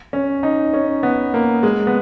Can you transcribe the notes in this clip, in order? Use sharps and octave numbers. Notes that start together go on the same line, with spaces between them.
C#4
D#4
C#4
B3
A#3
G#3
B3